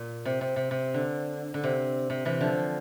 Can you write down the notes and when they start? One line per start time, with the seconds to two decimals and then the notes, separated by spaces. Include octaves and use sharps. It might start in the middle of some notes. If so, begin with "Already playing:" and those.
Already playing: A#2
0.25 C3
0.41 C3
0.56 C3
0.71 C3
0.94 D3
1.54 D3
1.64 C3
2.10 C3
2.25 C3 E3
2.40 D3 F3